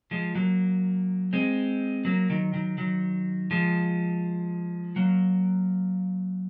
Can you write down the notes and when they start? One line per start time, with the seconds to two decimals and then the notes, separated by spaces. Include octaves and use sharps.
0.11 F3 G#3
0.35 F#3 A#3
1.33 G#3 C4
2.05 F#3 A#3
2.30 D#3 F#3
2.54 D#3 F#3
2.78 D#3 F#3
3.51 F3 G#3
4.96 F#3 A#3